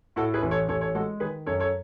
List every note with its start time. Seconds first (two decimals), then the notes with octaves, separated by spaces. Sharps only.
0.16 A2 F#4 A4
0.34 G#4 B4
0.43 A1
0.51 A4 C#5
0.69 A1 A4 C#5
0.81 A4 C#5
0.95 G#3 F#4 A4
1.20 D#3 G#4 B4
1.46 F#2 A4 C#5
1.60 A4 C#5